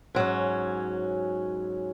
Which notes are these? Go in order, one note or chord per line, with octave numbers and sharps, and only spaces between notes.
G#2 F#3 C#4